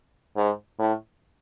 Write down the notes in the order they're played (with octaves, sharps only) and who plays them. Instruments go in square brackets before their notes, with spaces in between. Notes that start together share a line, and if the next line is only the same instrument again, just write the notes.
[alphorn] G#2
A2